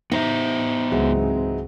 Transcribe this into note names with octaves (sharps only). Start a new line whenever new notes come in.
B3 D#4 C5 E5
C#2 G#2 E3 F#3 G#3 C4